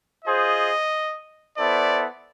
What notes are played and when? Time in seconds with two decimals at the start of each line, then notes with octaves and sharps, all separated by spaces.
0.25 F4 G#4 C5 D#5
1.58 B3 E4 A4 C5 D5